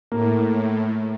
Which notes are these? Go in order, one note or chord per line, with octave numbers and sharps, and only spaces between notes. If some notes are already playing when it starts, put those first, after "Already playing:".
A2 A#3